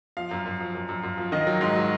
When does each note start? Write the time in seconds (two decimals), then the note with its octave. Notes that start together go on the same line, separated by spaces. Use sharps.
0.17 F3 F5
0.31 F#2
0.46 F#2
0.60 F3
0.75 F#2
0.89 F#2
1.03 F#2
1.18 F3
1.32 D#3 D#5
1.47 F#3
1.61 G#2
1.75 F#3